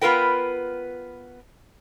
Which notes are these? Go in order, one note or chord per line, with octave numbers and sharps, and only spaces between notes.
B3 F4 A#4 B4 G5